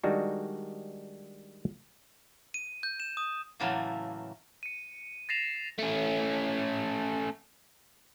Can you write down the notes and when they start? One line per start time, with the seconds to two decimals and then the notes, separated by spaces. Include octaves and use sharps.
0.04 D#3 G3 G#3 D4 D#4 F#4
2.54 D#7
2.83 G6
3.00 E7
3.17 D#6
3.60 A2 C#3 E3 F#3 A3 A#3
4.63 C#7 D#7
5.29 A6 A#6 C7 E7 F7
5.79 A3 C#4